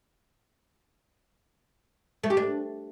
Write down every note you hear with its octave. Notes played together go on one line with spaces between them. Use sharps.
A3
G4
D4